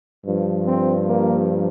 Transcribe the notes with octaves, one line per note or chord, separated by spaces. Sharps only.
G2 F3
C4
A#3